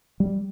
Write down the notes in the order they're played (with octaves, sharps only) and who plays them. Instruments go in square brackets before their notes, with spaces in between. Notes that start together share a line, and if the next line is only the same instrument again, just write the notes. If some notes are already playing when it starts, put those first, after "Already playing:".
[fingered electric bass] G3